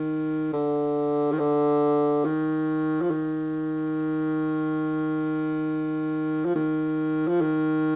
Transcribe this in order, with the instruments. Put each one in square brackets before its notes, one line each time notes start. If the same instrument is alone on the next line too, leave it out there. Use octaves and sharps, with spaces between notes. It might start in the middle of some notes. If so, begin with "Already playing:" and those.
Already playing: [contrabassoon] D#3
D3
D#3
D3
D#3
F3
D#3
F3
D#3
F3
D#3